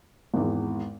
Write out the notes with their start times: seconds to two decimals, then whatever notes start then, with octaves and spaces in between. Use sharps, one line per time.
0.34 G#1 E2